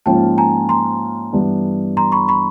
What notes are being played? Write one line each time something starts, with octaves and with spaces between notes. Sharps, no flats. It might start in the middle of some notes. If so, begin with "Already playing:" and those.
G#2 F3 A#3 C#4 F4 G5 A5
G#5 A#5
A#5 C6
G2 E3 G3 B3 D4
A#5 C6
B5 C#6
B5 C#6